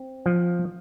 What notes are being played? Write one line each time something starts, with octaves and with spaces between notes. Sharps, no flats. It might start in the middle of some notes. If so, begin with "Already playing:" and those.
Already playing: C4
F3